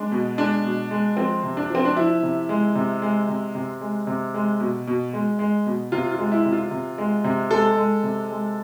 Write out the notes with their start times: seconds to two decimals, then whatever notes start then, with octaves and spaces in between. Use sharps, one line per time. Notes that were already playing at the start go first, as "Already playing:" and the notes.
Already playing: G#3 D4
0.12 B2
0.38 G#3 D4
0.64 B2
0.91 G#3
1.17 F3 C4
1.43 C3
1.57 D4
1.70 F3 C4
1.85 D4
1.97 F3 E4
2.23 C3
2.49 G#3
2.75 C3
3.02 G#3
3.28 C3
3.55 C3
3.81 G#3
4.07 C3
4.34 G#3
4.60 B2
4.87 B2
5.13 G#3
5.39 G#3
5.66 B2
5.92 C3 F4
6.12 F4
6.18 G#3
6.32 E4
6.45 C3
6.52 F4
6.71 C3
6.98 G#3
7.24 C3
7.51 G#3 A4
7.77 G#3
8.03 C3
8.30 G#3